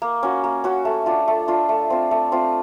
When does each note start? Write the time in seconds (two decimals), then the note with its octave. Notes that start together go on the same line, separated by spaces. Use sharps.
0.02 A#3
0.23 C#4 F#4
0.44 A#3
0.64 C#4 F#4
0.85 A3
1.06 D4 F4
1.28 A3
1.48 D4 F4
1.69 A3
1.90 C4 F4
2.11 A3
2.32 C4 F4